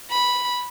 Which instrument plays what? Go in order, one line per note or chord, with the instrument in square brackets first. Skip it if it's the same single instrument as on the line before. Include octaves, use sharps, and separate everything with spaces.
[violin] B5